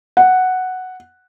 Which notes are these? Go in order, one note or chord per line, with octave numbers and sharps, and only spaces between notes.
F#5